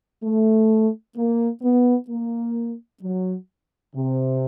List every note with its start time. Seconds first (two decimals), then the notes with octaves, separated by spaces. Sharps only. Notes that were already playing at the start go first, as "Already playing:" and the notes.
0.23 A3
1.16 A#3
1.62 B3
2.09 A#3
3.02 F#3
3.95 C3